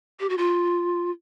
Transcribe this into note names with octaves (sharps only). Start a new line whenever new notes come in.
G4
F#4
F4